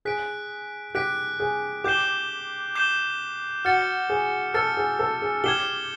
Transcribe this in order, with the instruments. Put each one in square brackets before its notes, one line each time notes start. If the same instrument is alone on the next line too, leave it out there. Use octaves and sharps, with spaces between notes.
[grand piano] G#4 [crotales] F#6 B6 D7
[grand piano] G4 [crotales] F#6 B6 D7
[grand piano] G#4
[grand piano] G4 [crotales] D6 G6 C7 E7 G7
[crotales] D6 G6 C7 E7 G7
[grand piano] F#4 [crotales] F6 A6 C#7
[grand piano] G#4
[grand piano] A4 [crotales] F6 A6 C#7
[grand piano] G#4
A4
G#4
[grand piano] G4 [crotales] F6 G#6 C7 E7 G7